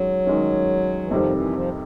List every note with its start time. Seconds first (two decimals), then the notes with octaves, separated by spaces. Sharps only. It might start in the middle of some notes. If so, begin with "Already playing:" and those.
Already playing: D#3 F#3 G#3 C#4
0.26 D#3 G#3 C#4
1.02 E3
1.11 F2 C3 D#3 F3 G3
1.32 E3
1.53 F3